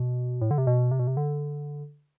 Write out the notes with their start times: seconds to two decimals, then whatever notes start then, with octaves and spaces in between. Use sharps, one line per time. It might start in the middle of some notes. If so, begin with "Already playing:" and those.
Already playing: B2
0.42 A2
0.51 D3
0.58 C3
0.67 B2
0.91 C3
1.00 B2
1.07 C3
1.17 D3